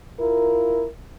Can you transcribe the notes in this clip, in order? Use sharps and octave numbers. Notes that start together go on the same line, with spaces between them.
E4 F4 A#4